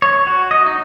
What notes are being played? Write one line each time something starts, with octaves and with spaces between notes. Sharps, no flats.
C#5
F#4
D#5
D#4